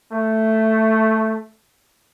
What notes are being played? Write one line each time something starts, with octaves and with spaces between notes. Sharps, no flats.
A3